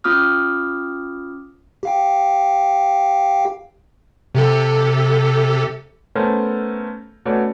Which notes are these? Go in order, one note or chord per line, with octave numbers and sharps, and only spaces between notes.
C#4 F4 D6 D#6 F6
G4 F5 G5
C3 G4 A4
A3 B3 C#4 A4 A#4 C5
A3 B3 C#4 F#4 C#5 D5